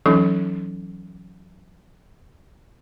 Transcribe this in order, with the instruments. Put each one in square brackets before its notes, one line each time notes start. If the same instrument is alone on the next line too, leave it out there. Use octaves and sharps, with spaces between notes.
[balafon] E3 F#3 C#4 D#4 A4